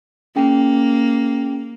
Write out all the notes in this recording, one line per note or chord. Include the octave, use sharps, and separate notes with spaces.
A#3 C#4 G#4 G5